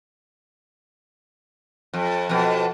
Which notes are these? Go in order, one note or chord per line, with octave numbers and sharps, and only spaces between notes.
F2
F2 B2